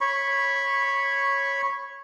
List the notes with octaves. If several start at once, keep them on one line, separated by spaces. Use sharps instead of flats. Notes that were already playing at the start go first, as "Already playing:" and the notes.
C#5 B5 C#6